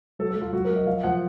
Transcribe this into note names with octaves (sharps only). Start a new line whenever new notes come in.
F#3 A4
A4
F#3
F4
F#3 F#4
A#4
F#3
D#5
F3 F5
F3 F#5